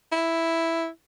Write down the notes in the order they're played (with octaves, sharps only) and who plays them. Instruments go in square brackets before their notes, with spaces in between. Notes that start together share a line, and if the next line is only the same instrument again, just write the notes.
[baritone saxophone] E4